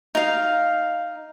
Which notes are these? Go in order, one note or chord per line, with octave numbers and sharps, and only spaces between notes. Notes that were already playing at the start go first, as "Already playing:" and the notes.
D#4 F5